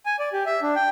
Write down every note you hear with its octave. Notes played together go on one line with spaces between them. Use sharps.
G#5
D5
G4
E5
D4
G5